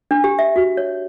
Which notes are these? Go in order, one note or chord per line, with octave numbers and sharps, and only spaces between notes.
D4
G4
E5
F#4
C#5